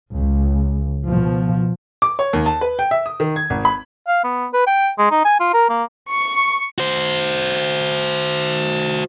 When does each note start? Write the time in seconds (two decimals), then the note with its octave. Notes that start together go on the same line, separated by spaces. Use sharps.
0.14 C#2
1.06 B2 F3
2.02 D6
2.19 C#5
2.33 D#2
2.46 A5
2.61 B4
2.79 G5
2.91 E5
3.06 D#6
3.20 D#3
3.36 G#6
3.50 G#1
3.65 B5
4.07 F5
4.24 B3
4.53 B4
4.67 G5
4.98 G#3
5.11 D#4
5.24 G#5
5.40 F4
5.53 A#4
5.69 A#3
6.11 C#6
6.78 F#4 C5